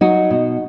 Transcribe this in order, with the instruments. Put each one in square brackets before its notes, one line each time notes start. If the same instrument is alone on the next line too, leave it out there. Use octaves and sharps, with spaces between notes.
[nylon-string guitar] F#3 D#4 F#4
B2